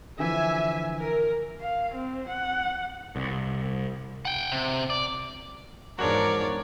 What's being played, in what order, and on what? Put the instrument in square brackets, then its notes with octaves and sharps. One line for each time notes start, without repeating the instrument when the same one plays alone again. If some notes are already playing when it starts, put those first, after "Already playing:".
[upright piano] D3 E3 F3 [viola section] E5 G#5
[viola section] A#4
[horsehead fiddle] F5
C4
F#5
[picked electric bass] C2
[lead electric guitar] F#5 G5
C3
D5
[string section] E2 G#2 [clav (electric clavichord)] F3 D4 F#4 [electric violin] A#4 D5 [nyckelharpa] C#5